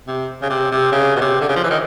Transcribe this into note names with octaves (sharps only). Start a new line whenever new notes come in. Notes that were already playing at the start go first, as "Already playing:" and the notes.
C3
C#3
C3
C3
C#3
B2
C3
D3
C#3
F3
E3
D#3